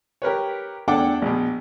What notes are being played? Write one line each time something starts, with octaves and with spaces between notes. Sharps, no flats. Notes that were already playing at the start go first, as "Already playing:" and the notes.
G4 A#4 B4 C#5
E2 D4 A4 F#5 G5 D6
A#1 B2